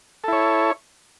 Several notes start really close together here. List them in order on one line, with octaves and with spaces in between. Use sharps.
A4 E4 C#5